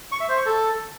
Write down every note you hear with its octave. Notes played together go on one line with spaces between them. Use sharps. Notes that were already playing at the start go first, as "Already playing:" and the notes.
C#6
E5
C5
C#6
A4